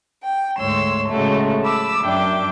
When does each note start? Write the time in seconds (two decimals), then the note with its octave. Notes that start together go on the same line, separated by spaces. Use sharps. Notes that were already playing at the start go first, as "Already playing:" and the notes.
0.23 G5
0.56 D2 G#2 C#5 C6 E6
1.10 A2 C#3 F#3 G#3 A3
1.62 A5 B5 D6 E6
2.01 F#2 D4 E5 G5 D6